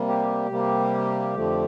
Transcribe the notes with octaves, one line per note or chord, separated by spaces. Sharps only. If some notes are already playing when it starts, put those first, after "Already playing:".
Already playing: C3 G3 A#3
G4
C3 G3 A#3
F2 D3 F3 A3